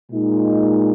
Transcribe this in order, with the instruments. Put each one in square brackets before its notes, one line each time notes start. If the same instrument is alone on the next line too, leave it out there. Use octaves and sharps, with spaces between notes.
[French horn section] A#2 G#3 D#4